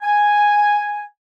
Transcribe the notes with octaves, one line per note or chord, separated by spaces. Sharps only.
G#5